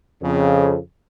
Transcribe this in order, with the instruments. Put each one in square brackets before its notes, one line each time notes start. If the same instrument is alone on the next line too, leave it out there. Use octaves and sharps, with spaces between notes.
[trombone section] F2 C#3